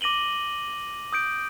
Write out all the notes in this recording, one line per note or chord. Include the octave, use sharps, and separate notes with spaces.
D6 A#6 D#7 F#7 G7
D#6 G6 D7